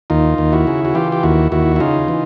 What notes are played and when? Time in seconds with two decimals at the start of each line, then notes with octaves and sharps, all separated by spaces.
0.10 D#2 D#4 F4
0.38 D#2
0.52 E4 F#4
0.67 C#3
0.85 F#4
0.95 E3 F4 G4
1.12 G4
1.23 D#2 E4 F#4
1.52 D#2 E4 F#4
1.76 E4
1.80 C#3 D#4 F4
2.08 E3